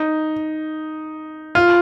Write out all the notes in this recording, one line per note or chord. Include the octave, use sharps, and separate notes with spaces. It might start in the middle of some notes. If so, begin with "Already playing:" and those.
Already playing: D#4
F4